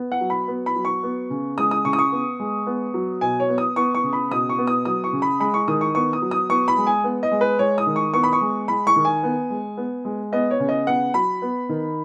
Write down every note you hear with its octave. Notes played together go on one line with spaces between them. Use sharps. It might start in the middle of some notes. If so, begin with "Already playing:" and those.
Already playing: B3
F#5
F#3
B5
B3
B5
F#3
C#6
B3
C#3
G#3 D#6
D#6
C#3 C#6
D#6
C#6
B3
G#3
B3
F#3
B2 G#5
C#5
B3
D#6
B3 C#6
C#6
C#3
B5
B2 D#6
C#6
B3
D#6
F#3 D#6
C#6
C#3
B5
G#3 B5
C#6
D#3 D#6
C#6
B3 C#6
D#6
F#3
D#6
B3 C#6
B5
G#3
G#5
B3
D#5
G#3
B4
G#3 C#5
D#6
D#3
C#6
B3 C#6
B5
C#6
G#3
G#3 B5
C#6
D#3
G#5
B3
G#3
B3
G#3
B3 D#5
C#5
C#3
D#5
B3 F#5
F#3 B5
B3
D#3